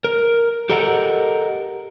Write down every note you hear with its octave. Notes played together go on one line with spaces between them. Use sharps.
A#4
G4 A4 A#4 D#5 F#5